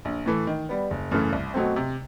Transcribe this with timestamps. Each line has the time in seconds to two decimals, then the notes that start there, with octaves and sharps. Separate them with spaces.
0.05 A#1
0.26 A2 E3 A3
0.47 D#3
0.69 G3 B3
0.90 F#1
1.11 F#2 C#3 E3 A3
1.32 C2
1.54 B2 F#3 A3 C4
1.76 C3